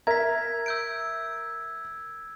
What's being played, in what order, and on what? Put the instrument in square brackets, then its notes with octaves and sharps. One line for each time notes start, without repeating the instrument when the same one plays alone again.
[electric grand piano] A#4 E5 A#5 [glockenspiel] G#6 B6
[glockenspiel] E6 G6 D7